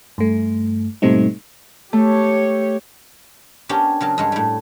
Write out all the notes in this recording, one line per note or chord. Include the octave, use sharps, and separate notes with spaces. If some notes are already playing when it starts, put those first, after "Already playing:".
G2 A3
G#2 B2 G3 A3 C4 D#4
A3 G4 C#5
B3 C#4 D4 G4 A#4 C#5
C#3 F#3 A#4 A5
G2 G#3 C#5
A2 G3